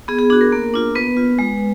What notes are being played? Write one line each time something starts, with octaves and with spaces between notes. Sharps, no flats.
B3 G#4
G#4
D4 F#4 G#4
A#4
A#3
D4 F4
B3 B4
F4
G#3